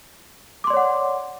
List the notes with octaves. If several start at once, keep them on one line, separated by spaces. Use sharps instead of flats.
C#5 D5 F#5 C6 D6